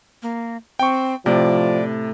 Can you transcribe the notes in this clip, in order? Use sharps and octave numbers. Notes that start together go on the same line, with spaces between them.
A#3
C4 G5 C#6
A2 C3 F3 D5